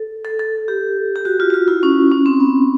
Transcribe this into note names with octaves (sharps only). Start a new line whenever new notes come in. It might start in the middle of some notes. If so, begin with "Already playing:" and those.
Already playing: A4
A4
A4
G4
G4
F#4
F4
F#4
F4
E4
C#4
C#4
C4
B3